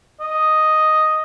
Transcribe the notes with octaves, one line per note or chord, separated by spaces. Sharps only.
D#5